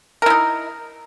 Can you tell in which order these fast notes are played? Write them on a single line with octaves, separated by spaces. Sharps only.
A#4 E4 D#4